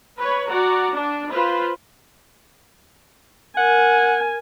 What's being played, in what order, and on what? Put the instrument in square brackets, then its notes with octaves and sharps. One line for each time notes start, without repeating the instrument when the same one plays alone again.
[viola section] B4 C#5
F#4 D5 F#5 A#5
D4
F4 B4 C5
[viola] A#4 G#5 [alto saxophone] F#5